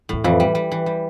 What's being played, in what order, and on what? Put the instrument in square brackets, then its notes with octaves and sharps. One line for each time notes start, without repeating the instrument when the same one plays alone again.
[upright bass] E2 [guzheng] A2
[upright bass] F2 [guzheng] E3
[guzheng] G3
G3
E3
G3